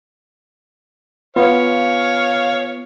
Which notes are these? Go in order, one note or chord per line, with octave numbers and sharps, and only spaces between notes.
B3 F4 C#5 F5